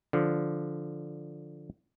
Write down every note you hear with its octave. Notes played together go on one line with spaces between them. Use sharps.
D3 F3